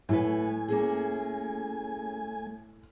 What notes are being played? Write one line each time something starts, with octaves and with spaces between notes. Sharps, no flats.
A2 F#3 A3 A4 B4 G#5
A#3 C#4 G#4